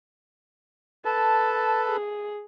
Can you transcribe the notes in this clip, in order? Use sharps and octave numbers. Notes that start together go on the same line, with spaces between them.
A4 B4 A5
G#4